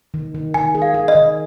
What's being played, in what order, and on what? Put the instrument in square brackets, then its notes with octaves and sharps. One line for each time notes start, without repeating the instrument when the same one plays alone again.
[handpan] D#3
D#3
[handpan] D#3 [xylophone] G#5
[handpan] G#4
[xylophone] F5
[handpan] G#4
[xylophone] D#5
[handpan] D#3